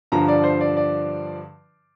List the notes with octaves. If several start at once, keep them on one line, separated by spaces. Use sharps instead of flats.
G2 D3 F3 A#5
D5
C5
D5
D5